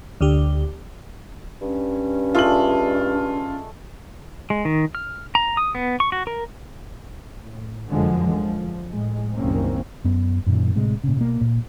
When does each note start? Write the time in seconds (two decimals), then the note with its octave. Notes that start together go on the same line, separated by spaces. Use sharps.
0.21 D2 D3 G4
1.62 G2 C#4
2.35 G#3 A3 D4 F4 F#7
4.50 G#3
4.65 D#3
4.95 F6
5.35 A#5
5.57 D#6
5.75 B3
6.00 C#6
6.12 F#4
6.27 A#4
7.41 A2
7.89 F1 F#2 D3 F3 G#3
8.30 F3
8.90 A2 G#3
9.36 F#1 C2 D#3 A#3 C4 C#4
10.04 F#2 B3
10.46 F#2 A#2 D#3
10.75 A2 C3 G#3
11.04 A#2 C#3
11.17 B2 A#3
11.41 A#2